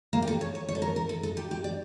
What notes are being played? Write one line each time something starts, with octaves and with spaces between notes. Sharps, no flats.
A#3
G4
A4
C#5
C#5
C#5
A4
A#4
A#4
A4
A4
G4
G4
D5